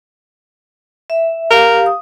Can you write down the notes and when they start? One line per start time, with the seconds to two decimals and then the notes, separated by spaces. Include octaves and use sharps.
1.10 E5
1.51 G4 A#4 F5
1.86 D#6